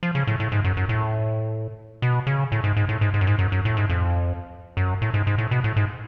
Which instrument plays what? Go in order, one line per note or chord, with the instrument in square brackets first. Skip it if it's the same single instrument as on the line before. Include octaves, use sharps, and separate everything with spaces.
[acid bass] F3
C#3
A2
A2
G#2
F#2
F#2
A2
B2
C#3
A2
G#2
G#2
A2
G#2
G#2
F#2
G#2
F#2
F#2
A2
G#2
F2
F#2
A2
G#2
G#2
A2
B2
A2
G#2